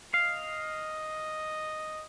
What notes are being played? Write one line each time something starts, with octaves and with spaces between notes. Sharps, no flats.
D#5 F5